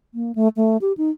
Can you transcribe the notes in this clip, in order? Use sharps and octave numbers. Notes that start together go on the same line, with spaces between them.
A#3
A3
A3
G4
D#4